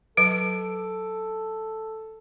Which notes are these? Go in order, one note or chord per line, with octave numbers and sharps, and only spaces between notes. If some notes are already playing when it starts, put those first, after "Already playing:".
F#3 A4 B4 D7